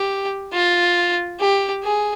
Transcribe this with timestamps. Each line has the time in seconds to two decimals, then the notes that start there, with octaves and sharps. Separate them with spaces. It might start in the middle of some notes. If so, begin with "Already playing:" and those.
Already playing: G4
0.53 F4
1.40 G4
1.84 G#4